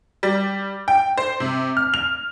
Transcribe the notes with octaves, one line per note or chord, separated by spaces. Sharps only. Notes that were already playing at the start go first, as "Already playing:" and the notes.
G3
G5
C5
C3
F6
F7